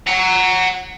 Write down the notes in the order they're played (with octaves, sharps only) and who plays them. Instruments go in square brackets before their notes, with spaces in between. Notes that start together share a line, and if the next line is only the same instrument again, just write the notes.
[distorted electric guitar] F#5 A#5